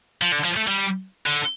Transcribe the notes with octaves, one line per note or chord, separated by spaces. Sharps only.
F3
D3
F3
A3
G3
D3